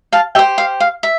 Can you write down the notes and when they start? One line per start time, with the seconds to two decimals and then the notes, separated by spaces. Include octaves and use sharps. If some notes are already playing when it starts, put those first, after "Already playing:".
0.13 F5 A5
0.35 G4 C5 E5 G5
0.58 F5
0.80 F5
1.03 E5